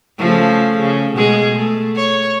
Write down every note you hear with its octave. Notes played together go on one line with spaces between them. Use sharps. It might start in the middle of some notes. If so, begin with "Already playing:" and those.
C#3 F3 A3
C#3
B2 G#3 G#4
A3
C#5